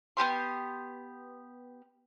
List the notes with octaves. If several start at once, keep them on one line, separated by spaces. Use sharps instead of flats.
B3 F#4 G4 C6